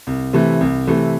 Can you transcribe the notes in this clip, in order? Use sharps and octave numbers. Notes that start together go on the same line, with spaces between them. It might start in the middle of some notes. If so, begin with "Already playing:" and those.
C2
C3 E3 A3
C2
C3 E3 A3